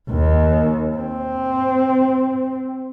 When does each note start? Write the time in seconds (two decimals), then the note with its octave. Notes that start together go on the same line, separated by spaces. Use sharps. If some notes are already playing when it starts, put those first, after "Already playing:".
0.10 D#2
0.97 C4